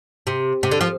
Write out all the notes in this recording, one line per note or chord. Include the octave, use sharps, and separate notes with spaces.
C3
C3
D3
F3